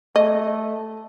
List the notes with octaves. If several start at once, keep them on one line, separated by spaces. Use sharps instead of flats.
A3 D#5